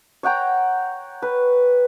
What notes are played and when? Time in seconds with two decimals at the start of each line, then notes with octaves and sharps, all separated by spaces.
0.23 C#5 F#5 G5 A#5
1.22 B4